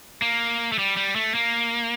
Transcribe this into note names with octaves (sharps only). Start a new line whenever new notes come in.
A#3
A3
G3
G3
A3
A#3